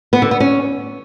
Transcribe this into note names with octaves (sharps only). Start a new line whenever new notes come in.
B3
D3
B3
C#4